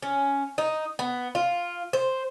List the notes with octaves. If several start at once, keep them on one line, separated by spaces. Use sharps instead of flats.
C#4
D#4
B3
F4
C5